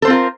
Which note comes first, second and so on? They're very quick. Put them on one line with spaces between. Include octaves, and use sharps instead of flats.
A4 C5 C4 F4 A#4